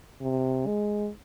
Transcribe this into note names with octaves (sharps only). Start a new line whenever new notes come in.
C3
G#3